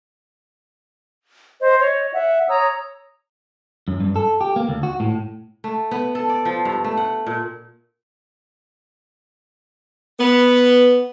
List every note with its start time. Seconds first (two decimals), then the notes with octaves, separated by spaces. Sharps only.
1.60 C5 D#5
1.80 C#5 D#5
2.13 E5 F#5
2.48 C#5 A#5 D#6 E6
3.88 F#2
4.00 G2
4.16 A4
4.41 G4
4.56 A#3
4.69 D2
4.83 F#4
5.00 A2
5.64 A3
5.91 B3
6.15 A4
6.29 D5
6.45 F3
6.65 G2
6.84 A3
6.97 F#5
7.26 A#2
10.19 B3